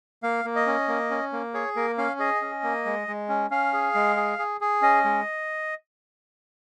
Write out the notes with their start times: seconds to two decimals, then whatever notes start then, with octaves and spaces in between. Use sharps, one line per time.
0.23 A#3 F5
0.45 A#3
0.56 D#5
0.67 C#4
0.88 A#3
1.11 C#4
1.32 A#3
1.54 G#4 C#5
1.76 A#3 A#4
1.98 C#4 F5
2.19 G#4 D#5
2.42 C#4
2.63 A#3
2.85 G#3
3.08 G#3
3.29 C#4
3.51 C#4 F5
3.73 G#4
3.95 G#3
4.17 G#4
4.39 G#4
4.61 G#4
4.82 C#4 D#5
5.04 G#3